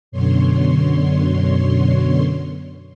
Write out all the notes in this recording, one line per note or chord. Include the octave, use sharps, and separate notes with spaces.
F#2 B2 D3 C#5 C6